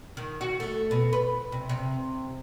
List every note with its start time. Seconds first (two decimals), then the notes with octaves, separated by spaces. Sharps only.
0.17 D#3
0.41 F#4
0.60 A3
0.91 B2
1.13 B4
1.52 C3
1.69 C3